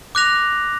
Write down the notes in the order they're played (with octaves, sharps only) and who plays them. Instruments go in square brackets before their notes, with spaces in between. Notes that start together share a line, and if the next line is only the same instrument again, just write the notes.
[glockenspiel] D6 F#6 A#6 F7